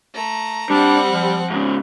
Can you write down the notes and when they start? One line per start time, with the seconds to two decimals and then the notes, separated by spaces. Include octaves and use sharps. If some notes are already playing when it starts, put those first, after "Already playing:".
0.14 A3 A#5
0.70 G3 C4 D4 F#5
1.11 F3
1.50 G#2 C#3